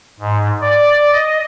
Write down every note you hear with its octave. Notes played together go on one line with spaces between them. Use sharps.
G#2
D5
D#5